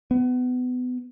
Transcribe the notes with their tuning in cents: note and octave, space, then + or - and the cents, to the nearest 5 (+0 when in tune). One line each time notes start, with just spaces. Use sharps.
B3 +25